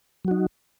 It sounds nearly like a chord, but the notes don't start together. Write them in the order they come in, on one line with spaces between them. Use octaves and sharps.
F#3 F#4 D#4